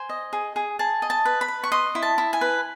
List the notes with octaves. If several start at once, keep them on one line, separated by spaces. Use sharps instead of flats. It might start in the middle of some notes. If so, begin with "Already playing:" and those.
Already playing: C5 G#5
D#5
G#4
G#4
G#4 A5
D#5
A5
B4
B5
B4
C#6
D#5 C6
E4
A5
E4
G#5
B4